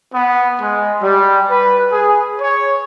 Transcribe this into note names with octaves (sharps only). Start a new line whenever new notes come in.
B3
G#3
G3
B4
G#4
C#5